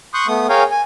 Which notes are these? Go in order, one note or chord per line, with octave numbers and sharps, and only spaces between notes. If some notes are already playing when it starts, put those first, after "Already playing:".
C6 C#6 D#6 F#6 G6
A3 B3 D#6
G#4 A#4 C#5 F5 G5 G#5
G#5